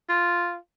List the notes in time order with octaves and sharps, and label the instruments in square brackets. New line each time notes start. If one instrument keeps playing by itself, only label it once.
[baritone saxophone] F4